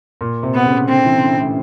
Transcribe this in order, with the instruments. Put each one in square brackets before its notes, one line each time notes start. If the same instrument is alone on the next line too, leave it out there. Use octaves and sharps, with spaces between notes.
[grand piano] A#2
C3
[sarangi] B3
[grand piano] C#3
[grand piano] D3 [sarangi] C4
[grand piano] E3
D3
A2